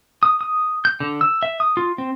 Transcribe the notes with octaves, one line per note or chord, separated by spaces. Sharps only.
D#6
D#6
G6
D3
E6
E5
D#6
F4
C4